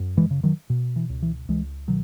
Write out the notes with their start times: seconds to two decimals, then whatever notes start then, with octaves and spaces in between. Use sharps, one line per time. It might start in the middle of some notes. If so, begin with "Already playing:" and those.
Already playing: F#2
0.17 E3 G#3
0.31 C#3
0.43 D#3 F#3
0.70 B2
0.96 E3
1.09 C#2
1.22 E3
1.49 C#2 E3 G#3
1.87 B2 D#3 F#3